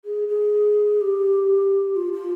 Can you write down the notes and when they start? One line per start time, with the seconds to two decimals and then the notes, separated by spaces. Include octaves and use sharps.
0.05 G#4
0.28 G#4
1.01 G4
1.96 F4
2.13 F4